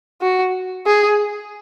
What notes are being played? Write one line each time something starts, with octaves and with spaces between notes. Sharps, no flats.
F#4
G#4